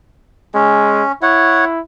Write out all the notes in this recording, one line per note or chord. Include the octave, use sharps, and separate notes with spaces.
G#3 C#4
E4 C#5 F#5